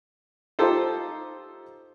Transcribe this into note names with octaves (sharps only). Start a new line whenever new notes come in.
D#4 F4 G4 A4 C5